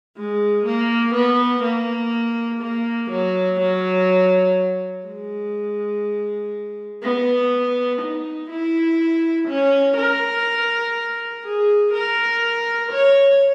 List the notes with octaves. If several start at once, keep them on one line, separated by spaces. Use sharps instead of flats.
G#3
A#3
B3
A#3
A#3
F#3
F#3
G#3
B3
D#4
E4
C#4
A#4
G#4
A#4
C#5